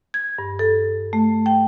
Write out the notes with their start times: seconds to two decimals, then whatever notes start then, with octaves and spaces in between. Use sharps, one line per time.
0.14 G#6
0.38 G2
0.59 A4
1.13 A3
1.46 G5